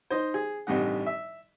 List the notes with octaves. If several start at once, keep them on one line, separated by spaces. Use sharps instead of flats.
D#4 C5
G#4
A1 G2 C3 G3 D#4 F#5
E5